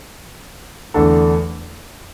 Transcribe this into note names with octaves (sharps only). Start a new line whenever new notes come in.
E2 D3 A3 D4 A4